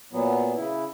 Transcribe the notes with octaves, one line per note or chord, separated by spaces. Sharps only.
A#2 F#3 B3
C#3 E4